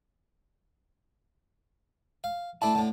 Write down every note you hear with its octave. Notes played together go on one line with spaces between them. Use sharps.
F5
A3 D4 E4 A5
A2 D3